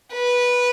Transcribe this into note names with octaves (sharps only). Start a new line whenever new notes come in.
B4